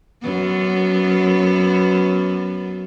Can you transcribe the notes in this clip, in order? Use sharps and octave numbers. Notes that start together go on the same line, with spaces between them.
F#2 B3